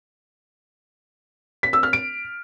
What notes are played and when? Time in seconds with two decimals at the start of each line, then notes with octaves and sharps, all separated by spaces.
1.63 B6
1.73 E6
1.83 F6
1.93 D7